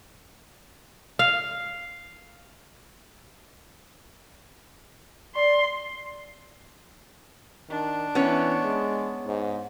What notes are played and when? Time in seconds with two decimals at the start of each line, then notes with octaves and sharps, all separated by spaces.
1.19 F5
5.35 D5 C6
7.70 D#3 D4
8.15 E3 B3 C#4 C#5
8.64 G#3
9.26 G#2